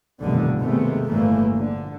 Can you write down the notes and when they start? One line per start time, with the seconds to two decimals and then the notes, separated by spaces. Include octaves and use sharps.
0.22 F1 B1 G2 D3 D#3 G3
0.59 D#2 C3 G#3 A3 B3
1.08 G1 A2 E3 A3 A#3
1.53 A#1 D3